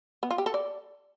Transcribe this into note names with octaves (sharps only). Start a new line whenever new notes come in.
B3
F4
G4
A4
D5